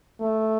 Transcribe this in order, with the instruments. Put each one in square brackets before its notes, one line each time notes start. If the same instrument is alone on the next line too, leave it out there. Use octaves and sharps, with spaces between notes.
[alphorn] A3